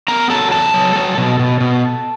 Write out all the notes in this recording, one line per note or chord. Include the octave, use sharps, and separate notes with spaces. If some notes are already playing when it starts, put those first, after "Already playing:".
B3 A#4 A#5
F#3 A4 A5
E2 A4 A5
F#3
F#3
B2
B2
B2